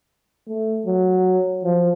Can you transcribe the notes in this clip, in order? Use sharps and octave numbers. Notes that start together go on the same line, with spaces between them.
A3
F#3
F3